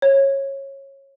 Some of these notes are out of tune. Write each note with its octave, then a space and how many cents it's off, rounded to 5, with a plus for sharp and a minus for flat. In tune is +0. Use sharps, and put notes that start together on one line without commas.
C#5 -20